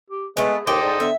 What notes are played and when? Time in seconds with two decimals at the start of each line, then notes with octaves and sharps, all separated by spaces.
0.10 G4
0.37 G#3 A3 B3 G#4
0.67 D#2 A4 C5 D#5 G5 D6
0.82 G#2 D5
1.00 D3 B3 E5